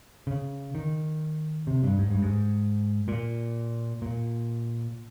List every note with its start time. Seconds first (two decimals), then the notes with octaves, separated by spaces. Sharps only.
0.27 C#3
0.75 D#3
1.67 C3
1.83 G2
1.99 G#2
2.11 G2
2.22 G#2
3.08 A#2
4.02 A#2